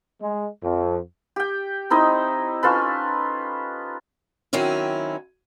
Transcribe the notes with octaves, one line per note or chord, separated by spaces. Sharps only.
G#3
F2
G4 G5
C4 D#4 E4 D#5
C#4 F4 A4 B4
D#3 F#3 C4 C#4 E4